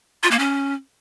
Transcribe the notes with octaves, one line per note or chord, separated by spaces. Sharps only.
F4
A#3
C#4